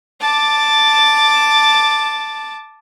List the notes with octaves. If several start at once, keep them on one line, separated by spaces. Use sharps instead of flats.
A5 D6